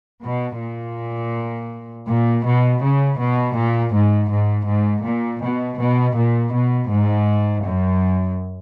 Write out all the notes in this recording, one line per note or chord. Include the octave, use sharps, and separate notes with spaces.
B2
A#2
A#2
B2
C#3
B2
A#2
G#2
G#2
G#2
A#2
B2
B2
A#2
B2
G#2
F#2